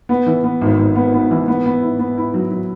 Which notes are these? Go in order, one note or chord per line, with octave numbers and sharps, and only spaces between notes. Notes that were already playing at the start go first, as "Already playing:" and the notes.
B3
E3
B3
G#1
G#1
B3
B3
E3
B3
B3
E4
B3
E4
F#3
F#3